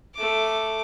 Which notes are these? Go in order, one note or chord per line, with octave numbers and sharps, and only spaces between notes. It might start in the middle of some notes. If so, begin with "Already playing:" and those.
A3 D6